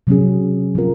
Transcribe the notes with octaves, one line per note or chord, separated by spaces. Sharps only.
C3 F#3 C#4 G#4
F3 C4 F4 A#4